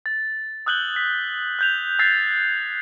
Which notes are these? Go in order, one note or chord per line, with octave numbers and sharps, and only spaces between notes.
A6
D#6 E6 F#6 G6 F#7 G7
E6 B6
F#6 G6 F7
E6 F#6 G#6 A6 B6 C7